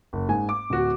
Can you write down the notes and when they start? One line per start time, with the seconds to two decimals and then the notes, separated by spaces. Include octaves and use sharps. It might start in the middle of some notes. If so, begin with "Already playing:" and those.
0.13 F#1
0.28 G#2 G#5
0.49 D6
0.70 D1 F#4